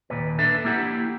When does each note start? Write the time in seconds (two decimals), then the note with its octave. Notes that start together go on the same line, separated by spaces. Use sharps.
0.10 D#2 A#2 B4
0.38 D4 A4 B4 E5
0.65 A#3 E4 G4 F#5